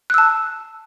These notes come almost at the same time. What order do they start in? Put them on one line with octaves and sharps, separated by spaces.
F#6 E6 A5